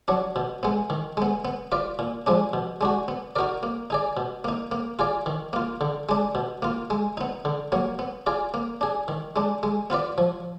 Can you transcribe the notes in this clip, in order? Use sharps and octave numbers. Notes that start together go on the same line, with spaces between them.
F#3 D4
B2
G#3 B3
D#3
G#3 B3
B3
F4 B4 D5
A#2
F3 G#3 D4
B2
G#3 D4 F#4
B3
D#4 F#4 A#4 D5
A#3
D#4 G#4 D5
B2
A#3 D#4
A#3
F4 G#4 D5
D#3
A#3 F4
D3
G#3 D4
B2
A#3 F4
G#3
B3 D#4
D3
F#3 A#3
B3
F4 G#4 D5
A#3
D4 G#4
D#3
G#3 D4
G#3
B3 F4 B4 D5
F3